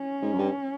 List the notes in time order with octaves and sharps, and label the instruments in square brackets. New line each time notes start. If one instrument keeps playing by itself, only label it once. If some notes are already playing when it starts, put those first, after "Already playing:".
Already playing: [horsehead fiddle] C#4
[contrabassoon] G#2
F#2
G2